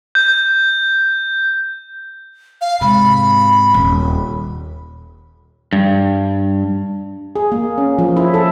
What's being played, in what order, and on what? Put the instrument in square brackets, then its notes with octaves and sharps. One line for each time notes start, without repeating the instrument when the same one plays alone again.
[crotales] G6
[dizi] F5
[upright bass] G#2 C3 [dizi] B5
[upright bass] D#1
[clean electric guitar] G2
[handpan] G#4
A#3
C#4
F3
E4
A4